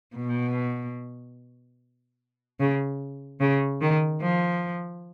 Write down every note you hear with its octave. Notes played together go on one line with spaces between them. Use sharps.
B2
C#3
C#3
D#3
F3